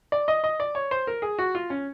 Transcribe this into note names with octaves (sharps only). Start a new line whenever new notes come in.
D5
D#5
D#5
D5
C#5
C5
A#4
G#4
F#4
F4
C#4